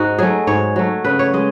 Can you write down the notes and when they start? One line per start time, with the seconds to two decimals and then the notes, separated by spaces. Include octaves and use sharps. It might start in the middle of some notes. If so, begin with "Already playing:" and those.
Already playing: G#2 D#4 F#4
0.18 F#3 A3 G#4
0.47 G#2 C#5
0.76 F#3 A3
1.04 C#3 B4
1.19 C#5
1.34 G#3 D#5